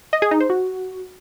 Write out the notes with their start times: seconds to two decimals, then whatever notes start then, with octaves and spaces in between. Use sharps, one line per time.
0.13 D#5
0.22 G#4
0.31 D#4
0.40 C5
0.50 F#4